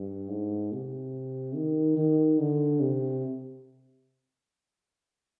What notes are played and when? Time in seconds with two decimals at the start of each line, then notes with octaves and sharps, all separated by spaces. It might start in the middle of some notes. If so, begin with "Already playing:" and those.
Already playing: G2
0.30 G#2
0.72 C3
1.55 D#3
1.97 D#3
2.39 D3
2.80 C3